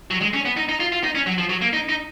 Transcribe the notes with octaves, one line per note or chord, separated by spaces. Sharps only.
F#3
G#3
C#4
B3
D#4
D#4
F4
F4
D#4
C#4
F#3
F3
F#3
A#3
D#4
D#4